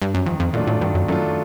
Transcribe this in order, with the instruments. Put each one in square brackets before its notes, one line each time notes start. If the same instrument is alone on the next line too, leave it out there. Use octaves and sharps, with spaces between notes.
[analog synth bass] G2
F#2
[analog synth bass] F2 [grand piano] D#3
[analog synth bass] F2
[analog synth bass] A#2 [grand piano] F#3 A3 D4 F4
[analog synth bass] A2
[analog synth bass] G2 [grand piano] D#3
[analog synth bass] F#2
[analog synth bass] F#2 [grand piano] F#3 A3 D4 F4